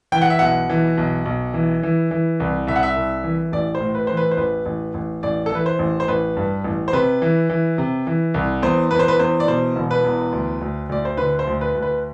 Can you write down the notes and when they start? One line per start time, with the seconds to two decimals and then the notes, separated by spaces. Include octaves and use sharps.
0.12 E3 G5
0.22 F#5
0.30 E5
0.39 B1 F#5
0.70 E3
0.98 B1
1.25 B1
1.54 E3
1.83 E3
2.11 E3
2.40 C2
2.67 C2 E5
2.76 F#5
2.83 E5
2.96 C2
3.24 E3
3.53 A1 D5
3.75 C5
3.81 A2
3.95 B4
4.07 E3 C5
4.17 B4
4.31 C5
4.37 A1 B4
4.66 A1
4.94 A1
5.23 A1 D5
5.46 A4
5.52 E3 B4
5.66 C5
5.79 A1
6.00 C5
6.08 A1 B4
6.37 G2
6.64 A1
6.88 C5
6.93 C3 B4
7.22 E3
7.50 E3
7.78 C3
8.07 E3
8.34 C2
8.62 E2 C5
8.91 E2 B4
8.99 C5
9.08 B4
9.19 E2 C5
9.40 D5
9.47 B2 C5
9.76 E1
9.91 B4
10.04 E2
10.32 D2
10.61 D2
10.89 D2 D5
11.05 C5
11.17 D3 B4
11.39 C5
11.47 D2
11.61 B4
11.75 D2
11.82 B4